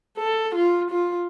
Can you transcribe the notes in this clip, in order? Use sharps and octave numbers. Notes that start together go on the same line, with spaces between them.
A4
F4
F4